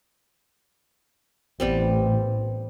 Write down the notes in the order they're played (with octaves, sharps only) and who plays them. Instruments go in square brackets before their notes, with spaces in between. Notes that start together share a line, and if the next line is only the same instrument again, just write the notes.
[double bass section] A1 [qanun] G3 B3 C4